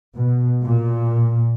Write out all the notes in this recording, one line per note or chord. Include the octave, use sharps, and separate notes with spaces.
B2
A#2